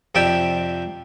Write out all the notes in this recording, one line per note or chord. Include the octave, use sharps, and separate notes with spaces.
F2 C3 G4 D5 E5 G5